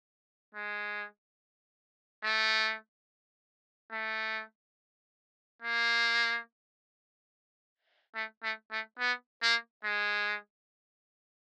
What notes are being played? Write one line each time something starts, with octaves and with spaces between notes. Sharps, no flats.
G#3
A3
A3
A#3
A3
A3
A3
B3
A#3
G#3